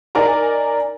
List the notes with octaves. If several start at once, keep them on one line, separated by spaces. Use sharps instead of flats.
D#4 A#4 D5 G#5 A#5